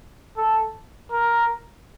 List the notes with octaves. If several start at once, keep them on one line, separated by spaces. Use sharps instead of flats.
A4
A#4